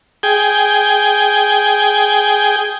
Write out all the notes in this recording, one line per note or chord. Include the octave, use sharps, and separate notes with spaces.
G#4 G5